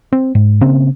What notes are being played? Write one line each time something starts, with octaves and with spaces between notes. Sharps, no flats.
C4
G#2
C#3 A#3 C4